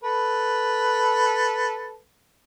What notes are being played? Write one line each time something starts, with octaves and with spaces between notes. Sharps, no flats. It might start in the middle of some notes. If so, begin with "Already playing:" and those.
A4 B4